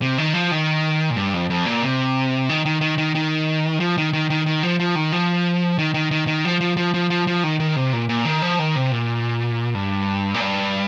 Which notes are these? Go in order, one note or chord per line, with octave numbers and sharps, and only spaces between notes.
C3
D#3
F3
D#3
A#2
G2
F2
F2
A#2
C3
D#3
D#3
D#3
D#3
D#3
F3
D#3
D#3
D#3
D#3
F3
F3
D#3
F3
D#3
D#3
D#3
D#3
F3
F3
F3
F3
F3
F3
D#3
D#3
C3
A#2
A#2
D#3
F3
D#3
C3
A#2
G2
A#2
G2